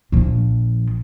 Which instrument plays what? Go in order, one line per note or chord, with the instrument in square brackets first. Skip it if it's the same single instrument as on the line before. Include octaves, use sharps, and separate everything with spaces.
[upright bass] A#1 F3